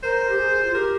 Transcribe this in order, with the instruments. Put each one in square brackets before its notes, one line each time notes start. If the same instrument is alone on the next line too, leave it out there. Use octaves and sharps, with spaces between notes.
[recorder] A#4 [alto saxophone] C5
[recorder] G4
G#4
F4
[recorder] G4 [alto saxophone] A#4